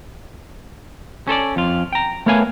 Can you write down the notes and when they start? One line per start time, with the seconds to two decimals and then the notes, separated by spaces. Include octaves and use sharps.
1.27 C#4 A4 C5 D5
1.56 F2 F4
1.93 G5 A#5
2.26 A3 B3 A#4 C#5 F5 G#5